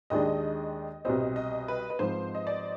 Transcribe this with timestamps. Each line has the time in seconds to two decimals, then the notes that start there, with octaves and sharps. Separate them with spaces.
0.10 D#2 D#3 G#3 D4 D#5
1.05 C2 B2 G3 C4 D#5
1.36 D#5
1.68 B4
1.90 B4
1.99 G#2 F3 C4 C5
2.35 D#5
2.47 D5